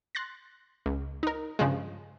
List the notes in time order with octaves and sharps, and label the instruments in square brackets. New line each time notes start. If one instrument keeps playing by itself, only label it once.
[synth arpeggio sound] C6 F#6 A6 A#6
C#2
D#4 A#4
G2 C#3 F3 G#3